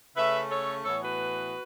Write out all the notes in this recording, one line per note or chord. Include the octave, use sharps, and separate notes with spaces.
C#3 A3 C#4 B4 E5
A4 C#5
A2 E3 B3 A4 C#5
F#4 B4